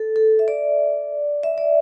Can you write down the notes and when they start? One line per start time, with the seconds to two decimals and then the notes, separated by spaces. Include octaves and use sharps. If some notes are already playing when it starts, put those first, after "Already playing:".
Already playing: A4
0.16 A4
0.39 E5
0.48 D5
1.43 E5
1.58 D5